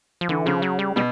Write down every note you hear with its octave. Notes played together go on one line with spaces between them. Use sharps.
F3
D3 E3
C#3 F3
F#3
G3
B2 G3